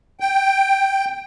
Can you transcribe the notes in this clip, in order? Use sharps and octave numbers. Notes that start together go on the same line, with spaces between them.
G5